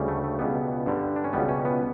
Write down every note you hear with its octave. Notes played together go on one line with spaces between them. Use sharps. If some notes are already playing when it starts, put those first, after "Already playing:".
Already playing: D2 C#3 G3
A3
A3
C#2 B2 G3 B3
G2 D3 G3
D4
C#4
C#2 B2 G3 B3
C#4
B3